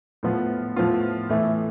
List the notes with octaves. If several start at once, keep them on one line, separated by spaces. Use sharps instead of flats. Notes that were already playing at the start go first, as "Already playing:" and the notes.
A2 F3 B3 F4
A2 F3 B3 F4
A2 E3 A3